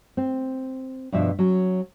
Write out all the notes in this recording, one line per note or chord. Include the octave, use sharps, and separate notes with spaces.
C4
G2 B2 F3 E5
F#3 C#4